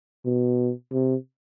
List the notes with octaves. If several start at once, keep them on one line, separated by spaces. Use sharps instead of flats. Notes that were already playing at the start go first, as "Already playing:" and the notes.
B2
C3